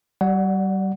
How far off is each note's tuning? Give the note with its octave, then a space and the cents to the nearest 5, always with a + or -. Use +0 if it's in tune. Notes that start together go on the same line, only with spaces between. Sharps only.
G3 -30 D5 +0 F#5 +0